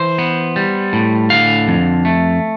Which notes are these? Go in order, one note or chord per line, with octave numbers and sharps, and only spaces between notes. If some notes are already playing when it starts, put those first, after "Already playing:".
Already playing: E3 C5
B3
G3
A2
D3 F5
F2
A3